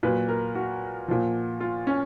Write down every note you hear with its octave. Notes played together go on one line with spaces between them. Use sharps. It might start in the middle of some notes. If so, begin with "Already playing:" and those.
A#2 F#3 B4
A#4
F#4
A#2 F3
F4
C#4